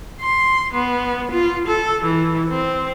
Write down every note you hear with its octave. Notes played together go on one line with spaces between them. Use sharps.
C6
B3
F4
A4
E3
C4